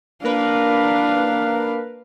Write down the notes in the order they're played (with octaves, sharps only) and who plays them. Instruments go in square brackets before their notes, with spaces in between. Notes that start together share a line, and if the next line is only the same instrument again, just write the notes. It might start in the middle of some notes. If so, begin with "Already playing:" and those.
[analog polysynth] A#3 A#4 B4 [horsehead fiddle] D4 F5